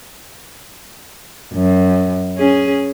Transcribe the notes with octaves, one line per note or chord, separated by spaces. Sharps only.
F#2
C#4 G#4